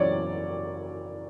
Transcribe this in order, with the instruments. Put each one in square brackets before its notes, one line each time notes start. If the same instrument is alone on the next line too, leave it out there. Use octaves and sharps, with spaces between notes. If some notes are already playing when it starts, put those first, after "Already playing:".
Already playing: [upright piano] F#1 F#2 E3 C#5 D5